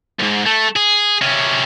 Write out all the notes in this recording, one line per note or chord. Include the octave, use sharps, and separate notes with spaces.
C2 G#2
A3
G#4
C3 C#4